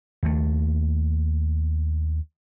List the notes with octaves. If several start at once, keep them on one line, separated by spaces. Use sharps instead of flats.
D#2 A3